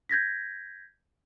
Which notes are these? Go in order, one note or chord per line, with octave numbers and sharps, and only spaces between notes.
G6 G#6 A#6 B6